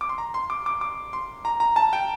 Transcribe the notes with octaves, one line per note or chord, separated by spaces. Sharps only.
D6
C6
A#5
C6
D6
D6
D6
C6
A#5
A#5
A5
G5